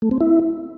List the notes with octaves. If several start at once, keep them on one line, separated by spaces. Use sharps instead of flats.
A3
C4
E4